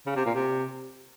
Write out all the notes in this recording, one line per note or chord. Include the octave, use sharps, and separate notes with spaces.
C#3
C3
A#2
C3